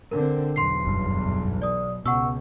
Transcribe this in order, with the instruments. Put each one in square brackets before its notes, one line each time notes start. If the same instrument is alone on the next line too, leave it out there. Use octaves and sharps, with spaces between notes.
[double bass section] D3 C4 [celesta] A#4
[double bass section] B1 E2 [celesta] C6 C7
[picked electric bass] F#1 G2
[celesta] D5 D#6
[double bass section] C#2 [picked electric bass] B2 [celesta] F#5 C#6 E6